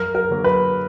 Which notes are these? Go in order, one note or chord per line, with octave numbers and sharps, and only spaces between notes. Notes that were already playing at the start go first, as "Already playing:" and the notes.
Already playing: F#2 A#4
A#4
D3 F#3 A#3
B4